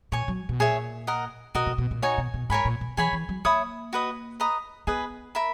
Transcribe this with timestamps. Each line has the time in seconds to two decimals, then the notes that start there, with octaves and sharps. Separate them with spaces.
0.12 A#2 C#5 G#5 C#6
0.28 F#3
0.49 B2
0.60 A#2 G#4 C#5 E5
1.07 A#4 D#5 F#5
1.55 B2 F#4 A#4 D#5
1.67 B2
1.78 B2
1.91 A#2
2.02 D#4 F#4 C#5 G#5
2.18 B2
2.34 B2
2.50 G#2 A#4 C#5 G#5 B5
2.65 A#2
2.81 B2
2.97 E3 G#4 C#5 G#5 B5
3.13 E3
3.29 F#3
3.45 A#3 C#5 E5 B5 D#6
3.93 F#4 B4 D#5
4.40 B4 D#5 A#5 D#6
4.87 B3 G#4 B4 D#5
5.35 A#4 E5 B5